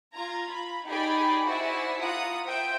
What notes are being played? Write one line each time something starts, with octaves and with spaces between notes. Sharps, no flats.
F4 A#5 G#6
B5
D#4 G4 G#4 D5 G5 B5
E4 F#4 G#4 C5 D5 E5
F4 F#5 A#5 D#6
C5 E5 G5